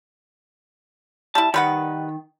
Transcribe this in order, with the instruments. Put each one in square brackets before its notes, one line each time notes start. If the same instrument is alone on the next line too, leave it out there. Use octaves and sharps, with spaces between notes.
[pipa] G3 E4 [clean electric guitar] A5
[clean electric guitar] D#3 [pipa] G3 B4 F#5